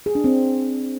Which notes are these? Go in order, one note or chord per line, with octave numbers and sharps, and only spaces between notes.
G#4
D4
C4